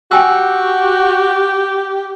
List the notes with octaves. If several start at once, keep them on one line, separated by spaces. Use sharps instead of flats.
F#4 G4 G5 G#5 E6